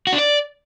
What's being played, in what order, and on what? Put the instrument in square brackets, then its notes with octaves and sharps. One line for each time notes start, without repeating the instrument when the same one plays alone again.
[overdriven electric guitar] F#4
D4
D5